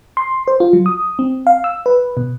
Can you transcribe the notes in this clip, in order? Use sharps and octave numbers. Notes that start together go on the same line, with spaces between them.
C6
C5
F4
F#3
D#6
C4
F5
E6
B4
B2